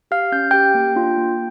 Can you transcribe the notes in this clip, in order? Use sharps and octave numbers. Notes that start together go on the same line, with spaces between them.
G4 F5 F6
C#4 G6
G4 G5 G6
A#3
D4 F4
A#3